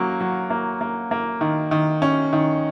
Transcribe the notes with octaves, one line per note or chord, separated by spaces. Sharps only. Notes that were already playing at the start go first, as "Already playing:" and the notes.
Already playing: F#3 A#3 C#4
F#3
A#3
A#3
A#3
D#3
D#3
C#4
D#3